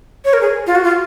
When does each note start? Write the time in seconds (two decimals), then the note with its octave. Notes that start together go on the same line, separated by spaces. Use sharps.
0.25 C#5
0.33 A#4
0.41 G#4
0.67 F4
0.75 F#4
0.84 F4